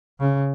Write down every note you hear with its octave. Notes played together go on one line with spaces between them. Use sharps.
C#3